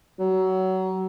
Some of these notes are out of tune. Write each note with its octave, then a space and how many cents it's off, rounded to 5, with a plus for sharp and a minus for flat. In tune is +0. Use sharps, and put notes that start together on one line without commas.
F#3 +25